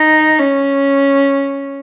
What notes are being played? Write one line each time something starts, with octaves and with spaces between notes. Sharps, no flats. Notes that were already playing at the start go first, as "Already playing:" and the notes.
Already playing: D#4
C#4